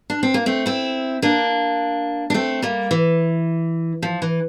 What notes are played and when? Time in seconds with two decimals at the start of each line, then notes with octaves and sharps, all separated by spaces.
0.10 D4
0.23 C4
0.34 A#3
0.46 A3 C4
0.66 C4 E4
1.22 A#3 D4
2.30 D4
2.34 A3 C4
2.62 G3 A#3
2.91 E3
4.02 F3
4.22 E3